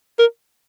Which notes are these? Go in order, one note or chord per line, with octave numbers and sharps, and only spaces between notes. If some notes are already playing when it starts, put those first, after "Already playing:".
A#4